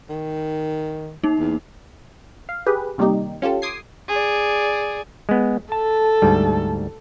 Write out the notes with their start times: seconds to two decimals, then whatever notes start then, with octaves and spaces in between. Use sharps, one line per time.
0.10 D#3
1.24 A#3 D#4
1.39 E2
2.49 F5
2.66 G4 G#4 B4
2.98 C3 D#3 G3 A#3 D#4 G4
3.42 C#4 F4 G4 A4
3.62 C6 D6 D#6 G#6 C7
4.08 G#4 D5
5.29 G#3 B3
5.72 A4 A5
6.22 D2 G#2 G3